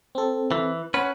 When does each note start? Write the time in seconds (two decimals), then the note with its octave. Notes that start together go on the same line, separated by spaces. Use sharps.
0.15 C4 A4
0.52 E3
0.94 C#4 B4 F#5